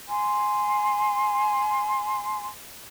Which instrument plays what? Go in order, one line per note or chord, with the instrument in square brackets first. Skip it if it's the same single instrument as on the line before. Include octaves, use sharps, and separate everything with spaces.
[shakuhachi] G#5 [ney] C6